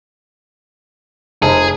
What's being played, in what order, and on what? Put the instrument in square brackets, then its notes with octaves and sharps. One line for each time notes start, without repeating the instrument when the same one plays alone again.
[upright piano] F1 [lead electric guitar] G#4